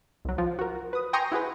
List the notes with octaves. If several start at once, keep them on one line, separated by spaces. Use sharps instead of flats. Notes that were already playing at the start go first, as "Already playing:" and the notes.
C2 F#3
F3 F4
F#4 A#4
B4 D#6
G5 G#5 A#5 C6 C#6 D#6
E4 F#4 G#4 B4